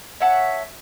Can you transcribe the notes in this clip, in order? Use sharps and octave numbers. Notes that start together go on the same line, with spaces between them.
C#5 E5 F#5 A5